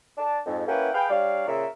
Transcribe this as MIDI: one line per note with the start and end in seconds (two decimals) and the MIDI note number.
0.17 0.39 62
0.17 0.39 81
0.46 0.64 41
0.46 0.64 44
0.68 0.90 58
0.68 0.90 61
0.68 0.90 64
0.68 0.90 71
0.68 0.90 78
0.68 0.90 79
0.94 1.09 68
0.94 1.09 71
0.94 1.09 77
0.94 1.09 79
1.10 1.44 55
1.10 1.44 62
1.10 1.44 73
1.10 1.44 74
1.10 1.44 77
1.48 1.66 46
1.48 1.66 49
1.48 1.66 70
1.48 1.66 76